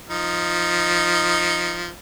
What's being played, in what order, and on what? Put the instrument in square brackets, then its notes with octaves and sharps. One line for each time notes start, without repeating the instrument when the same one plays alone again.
[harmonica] F3 D#4